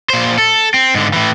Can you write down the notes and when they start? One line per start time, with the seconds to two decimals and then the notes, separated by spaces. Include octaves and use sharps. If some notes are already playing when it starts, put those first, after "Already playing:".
0.10 A#2 C5
0.38 A4
0.74 C4
0.94 G#2 D3
1.13 A2 E3